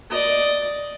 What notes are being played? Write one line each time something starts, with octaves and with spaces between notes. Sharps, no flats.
D5 D#5